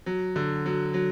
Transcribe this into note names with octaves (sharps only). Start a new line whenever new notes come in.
F#3
D3
F#3
F#3